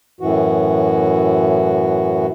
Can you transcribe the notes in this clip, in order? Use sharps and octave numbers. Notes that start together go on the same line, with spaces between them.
F#2 A2 E3 F#4